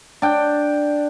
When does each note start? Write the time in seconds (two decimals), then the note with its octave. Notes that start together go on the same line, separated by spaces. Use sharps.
0.22 D4 G5